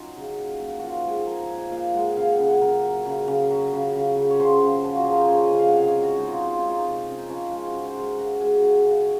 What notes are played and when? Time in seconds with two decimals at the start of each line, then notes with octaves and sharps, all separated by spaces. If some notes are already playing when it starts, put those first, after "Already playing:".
Already playing: F#3 C#4 D#4 F4
0.16 C#3
0.38 A#2
0.60 A#2
0.79 F3 F4 F#4
1.06 G#3 G#4
1.20 G#4
1.27 F3 A#4
1.43 C#5
1.50 A#2
1.57 D#5
1.72 A#2 F5
1.94 G#3 F#5
2.16 C#3 F5
2.32 F#5
2.39 C#3
2.47 F#5
2.62 C#3 A#4
2.83 F#3
3.05 C#3
3.28 C#3
3.50 F#3
3.73 C#3
3.95 C#3
4.17 C#3
4.31 C#5
4.40 C#3 C5
4.61 C#3
4.84 F3
4.96 F#4
5.04 F3 G#4
5.12 A#4
5.21 C5
5.28 C#3 C#5
5.44 D#5
5.51 C#3
5.58 F5
5.69 C3 F5 F#5
5.88 C#5
5.95 G#3
6.02 F#4
6.17 G#3 D#4
6.28 F4
6.38 F3 D#4
6.48 F4
6.59 G#3 D#4
6.70 F4
6.79 D#4
6.85 C3
7.07 C3 C#4
7.18 D#4
7.29 F3 C#4
7.51 G#3 F4
7.66 F#4
7.74 C#3
7.86 C5
7.96 G#3 A#4
8.18 C#3 F#4
8.40 G#3 G#4
8.56 F#4
8.62 C#3
8.85 C#3